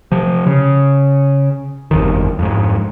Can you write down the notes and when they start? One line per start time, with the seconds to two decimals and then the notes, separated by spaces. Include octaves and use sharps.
0.12 C3 F3
0.47 C#3
1.91 G1 F2 D#3
2.39 F2 G#2